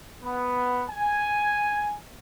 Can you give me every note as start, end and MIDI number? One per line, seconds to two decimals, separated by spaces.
0.23 0.84 59
0.90 1.94 80